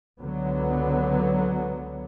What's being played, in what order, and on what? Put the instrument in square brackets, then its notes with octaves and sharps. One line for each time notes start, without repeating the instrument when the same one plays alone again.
[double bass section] C#2 D3 F#3 B3